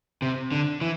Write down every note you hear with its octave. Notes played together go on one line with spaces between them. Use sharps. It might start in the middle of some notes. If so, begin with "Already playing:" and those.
C3
D3
E3